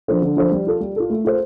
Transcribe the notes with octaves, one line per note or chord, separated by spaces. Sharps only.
F3 D4 A4 C5
D3
F3 D4 A4 C5
G3
F4 A4
G3
F4 A4
A3
F4 A4 C5